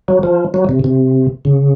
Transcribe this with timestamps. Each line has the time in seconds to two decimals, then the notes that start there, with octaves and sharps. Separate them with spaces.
0.08 F#3
0.23 F3
0.54 F#3
0.69 C3
0.84 C3
1.45 C#3